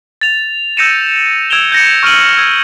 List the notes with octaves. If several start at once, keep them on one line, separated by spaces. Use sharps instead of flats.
A6 F7
E6 G6 A#6 C#7 D#7 E7
E6 G#6 D7 E7 F7 G7
G6 A#6 C#7
C#6 F6 D7 D#7 F#7
E6 G#6